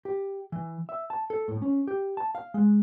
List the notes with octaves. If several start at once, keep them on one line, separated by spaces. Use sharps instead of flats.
G4
E3
E5
A5
A4
A2
C#4
G4
A5
F5
G#3